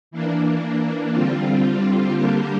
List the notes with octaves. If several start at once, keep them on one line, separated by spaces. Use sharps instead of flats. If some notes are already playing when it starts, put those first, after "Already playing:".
E3 A#3 D4
D3 G3 C4 F4
D3 G3 A#3 D4 G4